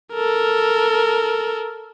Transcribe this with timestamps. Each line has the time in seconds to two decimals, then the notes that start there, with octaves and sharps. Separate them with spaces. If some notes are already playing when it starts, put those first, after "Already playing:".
0.13 A4 A#4